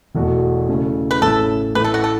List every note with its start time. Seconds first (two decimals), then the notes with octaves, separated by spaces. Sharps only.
0.15 E1 E2 B2 A3 F#4
0.68 C#3 E3 A3 C#4
1.11 B4
1.22 A1 A2 A3 C#4 E4 A4
1.75 A2 E3 A3 B4
1.84 A4
1.94 F#4
2.04 A4